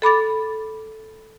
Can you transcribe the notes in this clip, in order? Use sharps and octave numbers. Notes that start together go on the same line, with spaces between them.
A4 B5 D6 A6